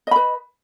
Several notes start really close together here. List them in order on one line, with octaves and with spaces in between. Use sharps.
D#5 B5 B4